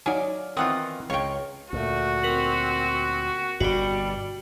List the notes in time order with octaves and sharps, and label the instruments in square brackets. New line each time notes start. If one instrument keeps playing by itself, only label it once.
[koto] F#3 [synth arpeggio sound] D#4 G#5 [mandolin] F4 D5
[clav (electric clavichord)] D#3 E3 F4 [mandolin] B3 D#6 [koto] C4 F#5
[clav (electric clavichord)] C#2 [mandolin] F4 C#6 [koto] C#5 G5
[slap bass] D2 A#2 [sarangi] A3 [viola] F#4
[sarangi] C4 [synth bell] A#4 B6 F#7
[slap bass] G1 G2 B2 [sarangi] G3 [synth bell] F#4 G4